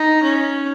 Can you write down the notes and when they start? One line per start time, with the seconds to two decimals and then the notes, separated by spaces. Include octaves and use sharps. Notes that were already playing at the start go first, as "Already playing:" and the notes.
Already playing: D#4
0.23 C#4